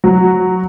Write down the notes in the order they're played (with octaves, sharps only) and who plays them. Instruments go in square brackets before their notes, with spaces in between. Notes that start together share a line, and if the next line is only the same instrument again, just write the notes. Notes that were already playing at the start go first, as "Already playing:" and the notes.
[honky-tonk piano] F#3